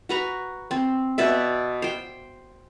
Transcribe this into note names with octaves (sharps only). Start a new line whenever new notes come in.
F#4 B4 A#5
C4
B2 B4 D5 E5
C5 G5